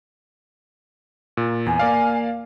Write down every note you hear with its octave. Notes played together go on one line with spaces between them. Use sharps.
A#2
E2 G#5
A#3 D5 F5